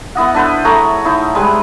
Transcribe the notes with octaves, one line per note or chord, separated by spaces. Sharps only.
B3 E4 D#5 F#5
D4 A4 B4 C5
A3 G#4 C#5 A#5
D#4 E4
G3 G#3 B4